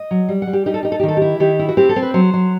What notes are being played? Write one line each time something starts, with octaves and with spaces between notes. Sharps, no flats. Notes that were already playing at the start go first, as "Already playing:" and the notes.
Already playing: D#5
F#3
G3
F#5
G3
G4
D#4 G4
A4
D#4 G4
A4
G4
D#3
A4
E4 G4
D#3 G4
E4
F#4
C4 G4
A4
C4
B4
F#3 C5
F#3